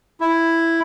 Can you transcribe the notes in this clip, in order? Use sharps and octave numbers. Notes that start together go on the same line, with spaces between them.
E4